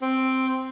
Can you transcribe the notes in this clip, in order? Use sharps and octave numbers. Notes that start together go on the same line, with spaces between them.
C4